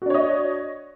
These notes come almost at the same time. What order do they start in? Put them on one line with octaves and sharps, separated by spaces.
F#4 D4 C#5 D#5